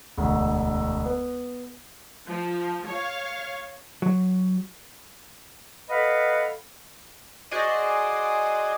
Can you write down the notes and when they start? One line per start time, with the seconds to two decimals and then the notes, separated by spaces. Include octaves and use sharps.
0.17 E1 D2
1.05 B3
2.27 F3
2.87 C#5 F5
4.02 F#3
5.90 A4 B4 D#5 F5 F#5 B5
7.51 F#4 G#4 C5 D5 D#5